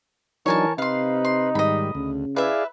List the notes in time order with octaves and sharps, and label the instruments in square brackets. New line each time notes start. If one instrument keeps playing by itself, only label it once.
[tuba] E3 [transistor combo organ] F#3 D4 D#4 [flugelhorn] A#4 [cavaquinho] C#5 G#5 A5
[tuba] C3 [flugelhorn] D#4 [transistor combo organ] B4 [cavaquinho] F5 C6
[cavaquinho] C6
[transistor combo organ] G#2 D#3 G3 [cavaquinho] D#5 B5
[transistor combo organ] D2 [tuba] C#3
[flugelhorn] E4 [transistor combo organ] G#4 D5 F5 [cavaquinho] B4 E5